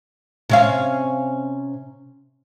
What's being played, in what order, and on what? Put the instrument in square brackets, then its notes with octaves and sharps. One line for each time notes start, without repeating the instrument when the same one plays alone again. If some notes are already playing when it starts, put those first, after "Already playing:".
[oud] C3 C#4 F5